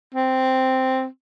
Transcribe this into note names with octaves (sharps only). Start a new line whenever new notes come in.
C4